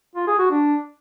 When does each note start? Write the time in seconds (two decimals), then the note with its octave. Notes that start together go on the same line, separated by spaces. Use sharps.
0.16 F4
0.27 G#4
0.39 F#4
0.51 D4